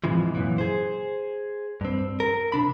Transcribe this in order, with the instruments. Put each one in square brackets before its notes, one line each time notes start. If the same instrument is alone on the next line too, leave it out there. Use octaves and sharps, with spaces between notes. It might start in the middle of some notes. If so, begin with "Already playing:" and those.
[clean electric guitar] G#2 C3 E3 F3
F#2 A#2 E3
G#4 C5
G2 C4
A#4
C3 D4 B5